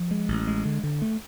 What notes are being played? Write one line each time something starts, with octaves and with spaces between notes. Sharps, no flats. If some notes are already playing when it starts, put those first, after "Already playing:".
Already playing: F3
G#3
A1
G#3
D3
D3
A3